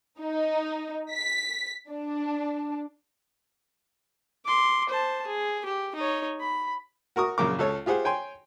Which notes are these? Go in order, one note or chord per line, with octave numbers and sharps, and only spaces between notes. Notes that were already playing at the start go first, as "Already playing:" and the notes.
D#4
B6
D4
C6 D6
C5 A5
G#4
G4
D#4 C#5
B5
F#4 A#4 C#6 D#6
A#1 F#2 C#3 A#4 D6
C#2 A4 C#5
F4 G4 G#4 C5 F#5
C#5 G5 G#5 C6